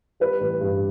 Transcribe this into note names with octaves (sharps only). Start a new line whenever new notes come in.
G3 B4
A1
G2